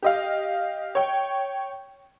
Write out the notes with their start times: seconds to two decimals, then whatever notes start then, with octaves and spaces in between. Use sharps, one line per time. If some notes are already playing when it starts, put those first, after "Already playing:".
0.02 G4 D#5 F5
0.95 C#5 G5